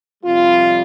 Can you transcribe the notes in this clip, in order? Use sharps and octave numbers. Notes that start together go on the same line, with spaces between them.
F2 C3 G3 F4